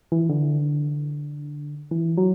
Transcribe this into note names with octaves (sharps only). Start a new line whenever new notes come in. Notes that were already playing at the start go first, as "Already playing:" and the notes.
E3
D3
E3
F#3